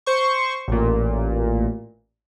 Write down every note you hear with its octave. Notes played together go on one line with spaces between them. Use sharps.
C5 C#6
A1 A#2